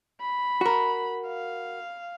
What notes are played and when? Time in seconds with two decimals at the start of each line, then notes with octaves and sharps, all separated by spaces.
0.21 B5
0.61 F#4 A#4
1.26 F5